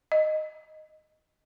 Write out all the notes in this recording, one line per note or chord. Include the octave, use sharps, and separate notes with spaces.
D#5